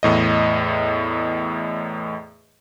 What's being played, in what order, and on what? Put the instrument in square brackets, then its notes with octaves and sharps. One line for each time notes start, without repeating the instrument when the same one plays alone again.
[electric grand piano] E2 A2 D#5